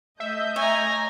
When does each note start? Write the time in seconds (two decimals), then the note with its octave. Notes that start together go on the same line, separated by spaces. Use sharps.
0.20 A3 D#5 E5 G6
0.56 C#5 G#5 A#5